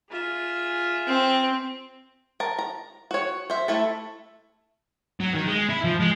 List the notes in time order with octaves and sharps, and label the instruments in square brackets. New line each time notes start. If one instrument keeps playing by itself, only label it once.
[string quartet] F4 G#4 E5
[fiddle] C4
[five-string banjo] A#4 A5
A#5
F#4 C#5
C5 E5
A3 E4 A4
[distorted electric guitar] F#3
D#3
G#3
E4
F3
G#3